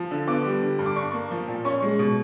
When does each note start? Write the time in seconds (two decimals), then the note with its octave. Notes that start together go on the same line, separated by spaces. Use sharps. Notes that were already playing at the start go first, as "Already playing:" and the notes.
Already playing: F3
0.11 D3
0.27 B3 D6
0.44 G3
0.63 D3
0.79 G2
0.86 D6
0.96 D4 C#6
1.13 A#3
1.31 F3
1.48 A#2
1.65 C#4 C#6
1.83 G#3
1.99 B2